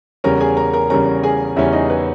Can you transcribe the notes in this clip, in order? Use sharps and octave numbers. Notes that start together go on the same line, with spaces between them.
E2 C#3 G3 C#4 A#4 A#5
G#4 G#5
A#4 A#5
A#4 A#5
E2 C#3 G3 C#4 A#4 A#5
G#4 G#5
E2 C#3 G3 C#4 E4 E5
D#4 D#5
B4